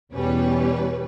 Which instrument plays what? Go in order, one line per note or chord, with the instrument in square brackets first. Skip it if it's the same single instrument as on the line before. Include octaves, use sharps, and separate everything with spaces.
[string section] E2 B2 G3 C#4 B4